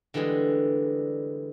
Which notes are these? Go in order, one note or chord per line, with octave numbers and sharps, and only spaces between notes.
D3 E3 G3 G#3 G#4